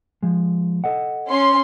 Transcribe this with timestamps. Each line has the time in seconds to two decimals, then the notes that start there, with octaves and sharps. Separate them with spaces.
0.23 F3 G#3
0.84 A4 D#5 F#5
1.26 C#4 C6